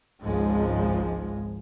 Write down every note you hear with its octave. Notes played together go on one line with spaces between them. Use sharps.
G#1 C#2 G#2 F3 G#3